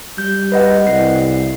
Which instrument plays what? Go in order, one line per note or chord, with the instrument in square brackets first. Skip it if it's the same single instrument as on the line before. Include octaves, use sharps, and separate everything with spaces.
[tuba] G3 [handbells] G6
[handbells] B4 D#5 F#5
[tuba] C2 [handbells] C7